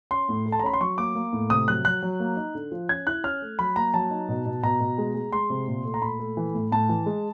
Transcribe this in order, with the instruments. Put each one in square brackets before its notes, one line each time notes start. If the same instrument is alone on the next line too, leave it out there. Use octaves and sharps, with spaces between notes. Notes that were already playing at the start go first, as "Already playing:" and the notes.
[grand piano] C#4 C6
A2
A3
A5
A#5
C#4 B5
C6
F#3 C#6
A#3 D6
A#3
A2
C3 D#6
F#3 F#6
F#3 F#6
F#3
A#3
D#4
D3
F3
C#4 G#6
E4 F#6
C#4 F6
A3
F#3 B5
A#3 A#5
F#3 A5
D#4
B2
B2
B2 A#5
B2
G#3
G#3
G#3 C6
C3
A#2
A3
A#5
A#2 B5
A3
E3
A2
A2 A5
E3
G#3